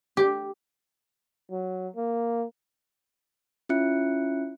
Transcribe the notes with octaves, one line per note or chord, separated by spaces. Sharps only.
G4
F#3
A#3
C#4 E4 F4 E5 F#6 C#7